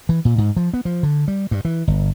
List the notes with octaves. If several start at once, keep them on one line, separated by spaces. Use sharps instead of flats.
E3
A#2
G#2
F3
B3
F3
D3
G3
G2
E3
G1